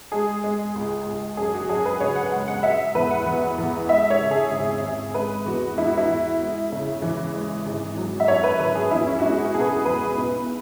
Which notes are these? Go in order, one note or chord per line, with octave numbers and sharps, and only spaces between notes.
G#3 G#4
G#3
C#2
C#2
F#2 G#4
F#4
F#2 G#4
B4
C#3 C#5
F#5
G#3 F#5
F#5
F#3 E5
E2 B4
F#5
E2
E2
G#3 E5
C#5
C#3
G#4
G#1
G#1
G#3 B4
E2 F#4
E2 E4
F#4
E4
E2
G#3
C#3
E3
G#3
G#1
F#3
E5
F#2 C#5
B4
G#1 B4
G#4
E2 E4
C#4
F#4
G#3 E4
G#4
F#4
B2 G#4
B4
G#4
E2 B4
B1